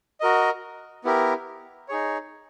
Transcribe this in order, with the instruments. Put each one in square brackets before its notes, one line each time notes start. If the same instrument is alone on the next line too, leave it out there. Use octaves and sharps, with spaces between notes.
[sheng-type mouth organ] F#4 A#4 D#5
B3 E4 G4 A#4
D#4 G#4 C#5